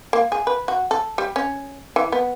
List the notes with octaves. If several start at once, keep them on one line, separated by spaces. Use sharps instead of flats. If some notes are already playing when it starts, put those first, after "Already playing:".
A#3
G#4
B4
F#4
A4
G3
C#4
E3
B3